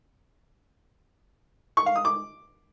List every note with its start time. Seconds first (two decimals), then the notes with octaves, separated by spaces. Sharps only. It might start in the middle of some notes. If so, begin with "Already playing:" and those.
1.77 C#6
1.86 F5
1.96 D#6
2.05 D6